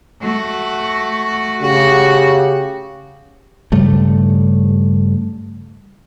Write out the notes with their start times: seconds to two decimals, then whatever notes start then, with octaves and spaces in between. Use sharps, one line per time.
0.21 A3 F#4
1.62 C#3 F#4 G4
3.72 G2 C#3 G3 A3